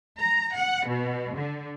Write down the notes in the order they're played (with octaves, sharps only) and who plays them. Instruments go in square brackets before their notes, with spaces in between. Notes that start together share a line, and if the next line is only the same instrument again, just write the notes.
[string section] A#5
F#5
B2
D3